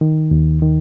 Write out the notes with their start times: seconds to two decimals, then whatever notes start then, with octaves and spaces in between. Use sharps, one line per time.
0.01 D#3
0.31 D#2
0.62 D#3